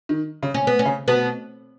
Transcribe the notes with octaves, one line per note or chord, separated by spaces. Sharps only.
D#3
C#3
C#4
B3
C#4
C#3
B2 B3